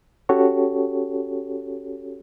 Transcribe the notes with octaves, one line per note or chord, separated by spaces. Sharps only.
C#4 F#4 G4 A4 C#5